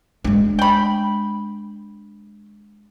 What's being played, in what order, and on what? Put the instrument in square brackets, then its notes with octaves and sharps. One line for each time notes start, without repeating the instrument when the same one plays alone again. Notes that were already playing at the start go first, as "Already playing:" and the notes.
[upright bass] G#3 D4
[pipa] G5 B5